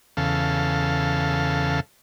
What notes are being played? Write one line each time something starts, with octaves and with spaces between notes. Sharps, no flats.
E2 C#3 A4 F5